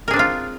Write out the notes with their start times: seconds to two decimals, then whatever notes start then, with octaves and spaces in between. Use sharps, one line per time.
0.08 A#4
0.11 G#4
0.13 D4
0.16 C4
0.19 F4